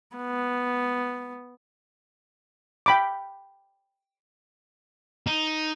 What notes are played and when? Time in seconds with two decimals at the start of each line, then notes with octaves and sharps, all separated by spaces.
0.17 B3
2.86 G5 B5 D6
5.27 D#4